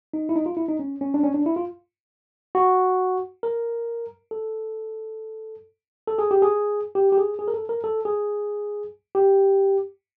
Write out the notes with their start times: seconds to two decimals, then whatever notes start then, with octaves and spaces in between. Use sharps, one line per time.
0.14 D#4
0.29 E4
0.36 D#4
0.46 F4
0.57 E4
0.68 D#4
0.79 C#4
1.01 C#4
1.14 D4
1.24 C#4
1.34 D4
1.46 E4
1.56 F4
2.55 F#4
3.43 A#4
4.31 A4
6.07 A4
6.19 G#4
6.31 G4
6.42 G#4
6.95 G4
7.12 G4
7.18 G#4
7.39 G#4
7.48 A#4
7.54 A4
7.69 A#4
7.84 A4
8.05 G#4
9.15 G4